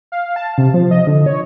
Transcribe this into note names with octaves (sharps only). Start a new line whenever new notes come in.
F5
A5
C3
F3
D#5
D3
C#5